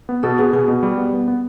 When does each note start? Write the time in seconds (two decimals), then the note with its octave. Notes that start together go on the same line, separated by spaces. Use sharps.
0.09 B3
0.23 B2 A4
0.38 B3 G#4
0.53 B2 G#4
0.68 B2
0.83 G3
0.98 B3
1.13 B3
1.28 B3